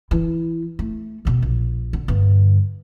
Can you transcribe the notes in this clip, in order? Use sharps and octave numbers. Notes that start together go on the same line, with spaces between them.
E3 E4
A3
D#2 B2
A#1
D3
G2 D3